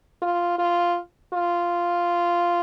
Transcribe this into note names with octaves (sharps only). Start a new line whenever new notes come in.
F4
F4
F4